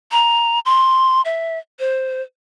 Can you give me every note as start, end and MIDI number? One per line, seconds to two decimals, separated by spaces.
0.12 0.59 82
0.66 1.22 84
1.25 1.59 76
1.79 2.21 72